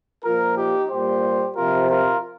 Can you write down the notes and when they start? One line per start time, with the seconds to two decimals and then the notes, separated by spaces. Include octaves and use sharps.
0.24 A#2 F3 F4 A#4
0.57 D#4 G4
0.90 A#2 G3 G4 C5
1.57 C3 F3 F4 A#4
1.90 F4 A#4